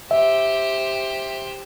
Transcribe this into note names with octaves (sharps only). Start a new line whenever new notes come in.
G4 C5 E5